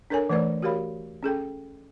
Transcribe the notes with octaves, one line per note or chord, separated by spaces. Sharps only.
D4 A4 A#4 C#5 G#5
E3 A3 B4 C5 D5
F#4 G4 A#4 C#5 F5 B5
C#4 G#4 A4 G5